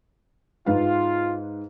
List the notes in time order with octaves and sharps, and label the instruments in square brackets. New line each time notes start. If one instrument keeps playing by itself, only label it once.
[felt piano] G#2 B4 F5 [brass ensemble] F4